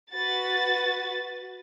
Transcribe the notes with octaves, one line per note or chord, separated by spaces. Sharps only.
F#4 B4 A6